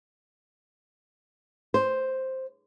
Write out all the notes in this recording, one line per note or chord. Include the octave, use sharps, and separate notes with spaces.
C5